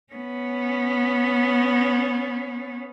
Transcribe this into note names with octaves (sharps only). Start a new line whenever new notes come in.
B3 C#4